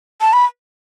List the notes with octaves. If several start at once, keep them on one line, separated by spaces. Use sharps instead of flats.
A5
B5